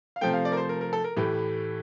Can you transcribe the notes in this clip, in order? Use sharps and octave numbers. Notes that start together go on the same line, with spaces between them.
F5
C3 F3 A3 G5
F5
D5
A#4
C5
A#4
A#4
A4
A#4
A2 E3 A3 G4